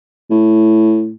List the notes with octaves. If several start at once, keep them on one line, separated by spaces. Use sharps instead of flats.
A2